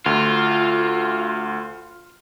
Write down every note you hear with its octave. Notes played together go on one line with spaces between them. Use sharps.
D2 F4